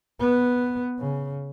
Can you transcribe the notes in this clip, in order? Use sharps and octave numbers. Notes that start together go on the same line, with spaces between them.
B3
C#3